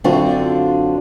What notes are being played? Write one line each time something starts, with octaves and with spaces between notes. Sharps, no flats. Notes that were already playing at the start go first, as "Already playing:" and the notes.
F#2 D3 C4 D4 F4 F#4